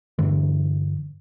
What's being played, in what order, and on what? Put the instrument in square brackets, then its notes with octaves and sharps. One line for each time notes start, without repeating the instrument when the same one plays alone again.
[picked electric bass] G2 D3 E3